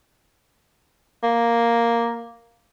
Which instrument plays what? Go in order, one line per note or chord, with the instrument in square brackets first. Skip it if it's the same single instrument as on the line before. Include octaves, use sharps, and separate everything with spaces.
[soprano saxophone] A#3